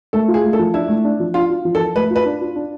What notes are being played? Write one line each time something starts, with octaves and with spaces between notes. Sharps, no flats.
A3 A4
F4
G#4
A3
A4
F3
D4 E4
A3
D4
F3
D4 F4
F4
F3
A4
F3
A3 B4
F4
B4
D4
F4
D4